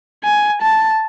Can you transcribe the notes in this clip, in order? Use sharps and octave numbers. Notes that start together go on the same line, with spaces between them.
G#5
A5